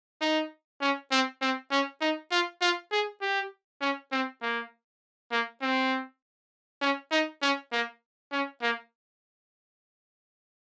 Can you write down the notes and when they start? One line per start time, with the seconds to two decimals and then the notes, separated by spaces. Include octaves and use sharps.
0.21 D#4
0.81 C#4
1.11 C4
1.42 C4
1.71 C#4
2.01 D#4
2.31 F4
2.61 F4
2.92 G#4
3.22 G4
3.81 C#4
4.12 C4
4.42 A#3
5.31 A#3
5.62 C4
6.82 C#4
7.11 D#4
7.42 C#4
7.72 A#3
8.32 C#4
8.62 A#3